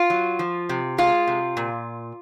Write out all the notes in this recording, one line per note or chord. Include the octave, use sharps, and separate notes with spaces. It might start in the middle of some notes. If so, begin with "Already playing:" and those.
Already playing: F4
F#3
F3
C3
G#3 F4
C3
A#2